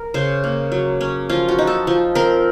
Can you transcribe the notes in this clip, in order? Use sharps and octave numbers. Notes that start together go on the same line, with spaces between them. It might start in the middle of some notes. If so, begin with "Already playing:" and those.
Already playing: A#4
C#3 C5
A#3
F#3
C#4
F3 F4
F#4
D#4
A4
F3
C4 A#4